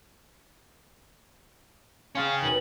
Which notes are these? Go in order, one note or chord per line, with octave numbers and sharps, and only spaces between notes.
C#4 G#4 F5 G5 C6 A6
D#2 B2 F#7